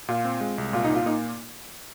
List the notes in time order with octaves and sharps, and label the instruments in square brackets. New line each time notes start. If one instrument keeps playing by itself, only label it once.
[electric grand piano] A#2 [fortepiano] F4
[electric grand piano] C4
G#3
C2
[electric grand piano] A#2 [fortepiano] F4
[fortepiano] D#4
[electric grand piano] A#2
[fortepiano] F4
[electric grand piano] A#3 [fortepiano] D#4